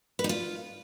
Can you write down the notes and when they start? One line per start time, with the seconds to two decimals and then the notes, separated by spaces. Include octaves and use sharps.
0.19 B4
0.24 D#4
0.29 F4